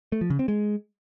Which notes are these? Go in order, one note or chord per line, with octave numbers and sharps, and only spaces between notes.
A3
F3
C#3
C4
G#3